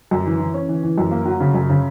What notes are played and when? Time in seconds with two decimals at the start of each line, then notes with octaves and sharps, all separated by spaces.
0.11 F#2
0.26 E3
0.39 E3
0.54 C#4
0.69 E3
0.83 E3
0.98 F#2
1.11 A#3
1.25 F#3
1.40 C#3
1.54 F#2
1.70 C#3